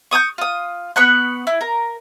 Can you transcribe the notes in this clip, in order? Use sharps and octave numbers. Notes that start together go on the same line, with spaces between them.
C#6 D#6 E6 G6
F4 D#6
B3 B5 C#6 F#6
E4
A#4